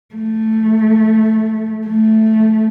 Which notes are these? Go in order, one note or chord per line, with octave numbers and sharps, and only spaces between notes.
A3
A3